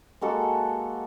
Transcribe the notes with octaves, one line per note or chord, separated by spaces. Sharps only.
G#3 A#3 F#4 A4